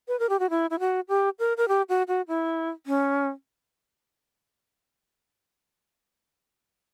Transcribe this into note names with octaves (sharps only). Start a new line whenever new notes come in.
B4
A#4
G4
F#4
E4
E4
F#4
G4
A#4
A#4
G4
F#4
F#4
E4
C#4